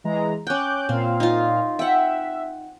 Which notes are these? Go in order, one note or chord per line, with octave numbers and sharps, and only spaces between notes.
E3 G#3 A#5
C#4 G5 D6 F#6 G6
A#2 C4 F5
D#4 F4
E5 F#5 G5